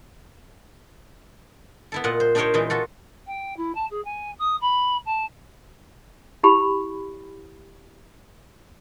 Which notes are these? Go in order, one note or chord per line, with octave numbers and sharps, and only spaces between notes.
B3 E4 A4
A#2 F4 D#5 F#5
C5
D4 D#4 G4 A#4 C5 C#5
A#2 E3 G#3 D#4
F4 F#4 A4
G5
E4
A5
G#4
G#5
D#6
B5
A5
E4 G4 B5